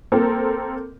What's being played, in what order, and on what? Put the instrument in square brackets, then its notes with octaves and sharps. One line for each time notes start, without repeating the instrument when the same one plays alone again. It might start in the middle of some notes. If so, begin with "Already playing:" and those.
[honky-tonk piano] A#3 C4 A4 A#4